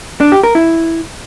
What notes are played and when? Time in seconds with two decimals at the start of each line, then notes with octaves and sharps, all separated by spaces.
0.20 D4
0.32 G4
0.43 A#4
0.55 E4